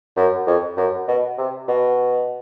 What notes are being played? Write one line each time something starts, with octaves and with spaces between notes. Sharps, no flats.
F#2
F2
F#2
B2
C3
B2